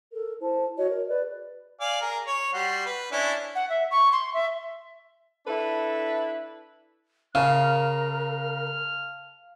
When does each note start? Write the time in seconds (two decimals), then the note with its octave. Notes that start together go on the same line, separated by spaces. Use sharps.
0.13 A4 A#4
0.41 E4 C5 A5
0.78 F#4 C#5 D#5
0.89 A#4
1.09 G#4 B4 D5
1.81 D5 F5 G#5
2.02 G#4 A#4
2.27 C#5
2.54 G3 F#4 C6
2.86 B4
3.12 C#4 D4 E4
3.55 F#5
3.70 E5
3.91 C#6
4.12 C6
4.34 E5
5.46 D4 E4 A4 B4
7.35 C#3 A#4 F5 A5 F6